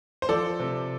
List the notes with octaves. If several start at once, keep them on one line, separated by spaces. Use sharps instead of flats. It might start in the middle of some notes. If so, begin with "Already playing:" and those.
C5
F3 A4 D5
C3